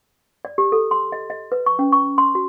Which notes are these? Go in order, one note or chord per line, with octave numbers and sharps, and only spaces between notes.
D5
G4
A4
C6
D#5
D#5
B4
C#6
C#4
C#6
C6
F#4